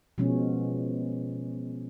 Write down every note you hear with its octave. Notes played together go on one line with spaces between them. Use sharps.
B2 F3 G#3 C#4